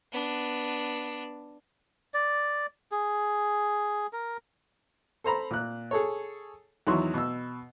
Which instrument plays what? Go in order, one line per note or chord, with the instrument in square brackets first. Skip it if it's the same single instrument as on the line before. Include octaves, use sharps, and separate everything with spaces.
[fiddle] B3 D4
[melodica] D5
G#4
A#4
[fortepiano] A4 C5 A#5 B5
A#2 F#6
G#4 A4 C#5
E2 D#3 F#3 E4 C6 C#6
B2 E6